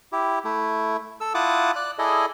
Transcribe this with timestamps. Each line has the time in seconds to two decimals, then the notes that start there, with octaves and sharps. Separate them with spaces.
0.12 E4 G4
0.45 A3 E4
1.21 A4 E6
1.34 E4 F4 F#5 A5 D6 D#6
1.76 D5 F#6
1.99 E4 G#4 A4 D5 D#5